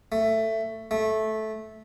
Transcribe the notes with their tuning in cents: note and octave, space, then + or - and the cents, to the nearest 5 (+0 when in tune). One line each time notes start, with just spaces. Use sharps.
A3 +10
A3 -15